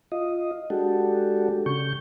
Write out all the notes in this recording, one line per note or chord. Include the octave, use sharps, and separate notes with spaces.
F4 D#5
G#3 D4 F#4 G4 A4
C#3 C#6 G6